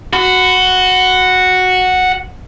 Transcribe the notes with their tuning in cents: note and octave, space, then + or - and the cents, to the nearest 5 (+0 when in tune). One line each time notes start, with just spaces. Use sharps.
F#4 -5 B5 +40